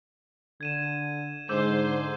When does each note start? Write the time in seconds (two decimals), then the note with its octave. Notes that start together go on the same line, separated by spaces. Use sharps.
0.61 D3 G#6 D#7 E7
1.49 G#2 D3 G#3 C5 D6 E6 G6